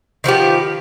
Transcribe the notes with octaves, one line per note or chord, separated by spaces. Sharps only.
D#3 F3 B3 G4